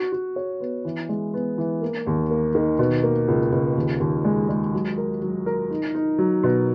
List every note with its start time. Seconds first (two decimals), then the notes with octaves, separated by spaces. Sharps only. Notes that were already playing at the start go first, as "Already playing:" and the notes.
Already playing: F#4
0.12 F#4
0.36 C#5
0.60 B3
0.85 E3
1.09 G#3
1.34 B3
1.58 E3
1.82 A#3
2.07 D#2
2.31 A#3
2.55 D#3
2.79 B2
3.03 A#3
3.28 C#2
3.52 C#2
3.76 D#2
4.00 D#2
4.25 G#3
4.49 G#3
4.73 F#3
4.98 A#4
5.22 F#3
5.46 A#4
5.71 D#4
5.95 D#4
6.18 F#3
6.43 B2